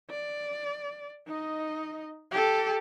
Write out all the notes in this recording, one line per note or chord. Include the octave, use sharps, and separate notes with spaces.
D5
D#4 D#5
G4 A4